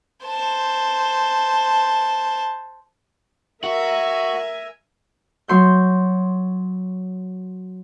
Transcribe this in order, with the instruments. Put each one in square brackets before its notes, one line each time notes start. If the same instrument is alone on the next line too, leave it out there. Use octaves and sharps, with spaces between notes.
[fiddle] C5 A5
[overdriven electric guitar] F#4 [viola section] A#4 E5 G#5
[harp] F#3 C6 G6